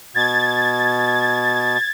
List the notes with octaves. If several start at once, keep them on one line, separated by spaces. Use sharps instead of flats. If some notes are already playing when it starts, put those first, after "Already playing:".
B2 G#6 A6